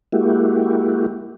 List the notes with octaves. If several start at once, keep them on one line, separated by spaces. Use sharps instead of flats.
G#3 A#3 E4 F#4 G4